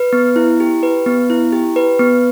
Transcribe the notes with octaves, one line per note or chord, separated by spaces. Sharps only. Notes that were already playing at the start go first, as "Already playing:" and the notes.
Already playing: B4
B3
E4
G4
B4
B3
E4
G4
B4
B3